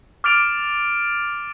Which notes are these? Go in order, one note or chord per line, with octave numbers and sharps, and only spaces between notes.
D6 F6 A6 D7 F7